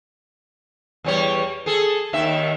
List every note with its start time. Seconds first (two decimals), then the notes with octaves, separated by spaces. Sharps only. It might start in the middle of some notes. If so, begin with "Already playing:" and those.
1.04 E2 G3 C#5
1.66 G#4 A4
2.13 D#2 D#3 E5